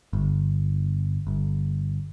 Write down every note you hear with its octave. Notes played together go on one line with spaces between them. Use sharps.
G1
G1